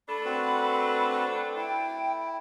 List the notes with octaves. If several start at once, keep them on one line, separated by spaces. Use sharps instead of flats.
A3 D4 A4 B5
C4 F#4 B4
E4 G5